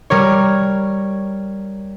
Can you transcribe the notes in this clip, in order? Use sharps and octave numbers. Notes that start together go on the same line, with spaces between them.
G3 A#4 C#5